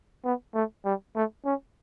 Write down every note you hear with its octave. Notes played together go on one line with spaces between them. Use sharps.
B3
A3
G3
A3
C#4